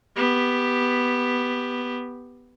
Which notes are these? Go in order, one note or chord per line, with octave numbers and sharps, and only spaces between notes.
B3 G4